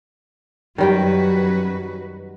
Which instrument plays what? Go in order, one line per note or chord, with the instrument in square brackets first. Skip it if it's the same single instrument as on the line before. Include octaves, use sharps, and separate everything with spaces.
[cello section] F#2 F#4 B4 [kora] D#3 G3 G5